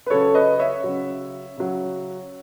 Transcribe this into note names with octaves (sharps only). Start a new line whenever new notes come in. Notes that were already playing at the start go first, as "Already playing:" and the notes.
B4
C#3 F#3 A4 C#5
B4 D#5
C#5 E5
C#3 F#3
C#3 F#3